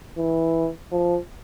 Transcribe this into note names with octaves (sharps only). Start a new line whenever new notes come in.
E3
F3